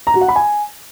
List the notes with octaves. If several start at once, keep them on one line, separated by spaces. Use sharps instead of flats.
A#5
F#4
F#5
B5
G#5